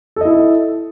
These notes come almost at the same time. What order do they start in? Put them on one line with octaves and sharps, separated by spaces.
A4 D#5 E4